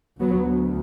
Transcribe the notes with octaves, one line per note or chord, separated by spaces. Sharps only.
D2 F#3 B3